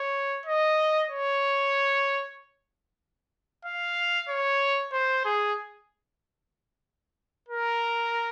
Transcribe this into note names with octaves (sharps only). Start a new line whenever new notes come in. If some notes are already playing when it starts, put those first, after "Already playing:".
Already playing: C#5
D#5
C#5
F5
C#5
C5
G#4
A#4